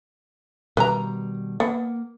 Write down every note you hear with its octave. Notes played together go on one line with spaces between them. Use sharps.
B2 D#3 G3 B4 A#5
A#3 B3 F#5